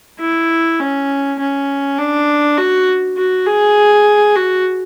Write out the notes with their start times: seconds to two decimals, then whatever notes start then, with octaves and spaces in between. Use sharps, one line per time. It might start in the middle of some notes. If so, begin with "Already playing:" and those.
0.20 E4
0.80 C#4
1.39 C#4
1.98 D4
2.58 F#4
3.17 F#4
3.47 G#4
4.36 F#4